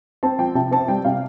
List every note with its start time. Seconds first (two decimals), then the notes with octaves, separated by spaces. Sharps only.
0.23 C4 A5
0.39 F3 G5
0.55 C3 A5
0.71 C4 A5
0.88 G3 G5
1.05 C3 F5